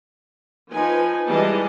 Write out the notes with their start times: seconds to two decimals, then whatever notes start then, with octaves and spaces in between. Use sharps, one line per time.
0.71 F3 D#4 B4 G#5
1.27 E3 G3 G#3 G#4 D#5 A5